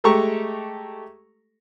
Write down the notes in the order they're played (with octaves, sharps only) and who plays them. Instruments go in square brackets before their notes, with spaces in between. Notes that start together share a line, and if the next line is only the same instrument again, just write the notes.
[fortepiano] G#3 A3 G4 A4 A#5 C#6